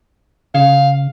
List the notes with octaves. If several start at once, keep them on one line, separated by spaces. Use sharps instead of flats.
C#3 F5